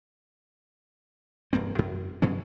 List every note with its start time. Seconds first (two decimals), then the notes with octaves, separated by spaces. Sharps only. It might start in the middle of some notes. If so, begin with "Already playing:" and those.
1.53 E1 G2 A#3 C4
1.79 F#2
2.22 G2 B2 F#3 C#4